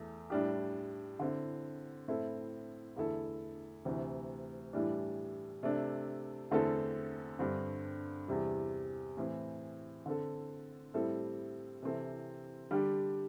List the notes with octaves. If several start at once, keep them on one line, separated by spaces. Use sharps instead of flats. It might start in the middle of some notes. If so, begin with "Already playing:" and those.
Already playing: E2 E3 A3
A2 G3 D4 G4
D3 C4 E4
A2 A3 C4 E4 A4
E2 D3 A3 E4 A4
D2 C3 E3
A2 E3 G3 D4
C3 A3 D4
E2 D3 A3 C4 A4
G2 D3 C4
E2 C3 G3
A2 E3 C4
D3 C4 A4
A2 G3 C4 E4 A4
C3 E3 C4 A4
D3 G3 D4 G4